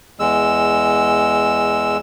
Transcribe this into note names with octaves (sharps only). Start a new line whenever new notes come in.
E2 G#3 E6